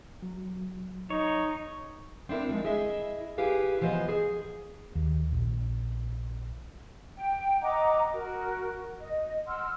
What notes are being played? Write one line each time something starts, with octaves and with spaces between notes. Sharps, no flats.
F#3
D#4 C#5
C4 D4 E4 A#4
F3 F#3 G#3
E4 G#4 D#5 E5
E4 G4 G#4 B4 F5
E3 F3 B3 C5 D#5
G#4
D#2
A#1
G5
D#5 F#5 A#5 D6
F#4 A#4
D#5
F#5 C6 E6 F6